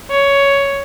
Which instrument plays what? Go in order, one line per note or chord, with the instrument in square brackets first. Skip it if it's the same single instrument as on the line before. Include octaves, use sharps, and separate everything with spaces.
[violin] C#5